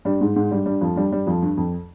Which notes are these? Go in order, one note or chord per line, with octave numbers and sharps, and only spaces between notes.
G2 G3
G#2 G#3
G#2 G#3
G2 G3
G2 G3
F2 F3
G2 G3
G2 G3
F2 F3
G2
F2